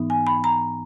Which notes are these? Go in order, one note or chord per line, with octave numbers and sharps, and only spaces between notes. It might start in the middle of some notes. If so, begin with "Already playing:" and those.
Already playing: G#2 E3 B3 D#4
G#5
B5
A#5